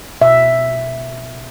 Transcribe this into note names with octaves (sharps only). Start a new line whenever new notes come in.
B2 E5